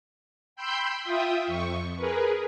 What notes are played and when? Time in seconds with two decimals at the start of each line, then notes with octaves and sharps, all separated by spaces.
0.56 G5 B5 C6 E6 G6
1.04 F4 E5 G5 D#6
1.47 F2 C#6
1.96 G#4 A#4 B4